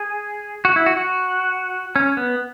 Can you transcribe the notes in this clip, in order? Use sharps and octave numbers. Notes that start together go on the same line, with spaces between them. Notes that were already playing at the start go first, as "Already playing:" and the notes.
Already playing: G#4
F#4
E4
F#4
F#4
C#4
B3